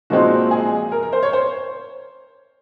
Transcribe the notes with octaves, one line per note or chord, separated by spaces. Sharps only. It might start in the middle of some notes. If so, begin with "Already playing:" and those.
A#2 F3 G#3 C4 D#4 F#4
G#4
A#4
A#4
C5
C#5
C5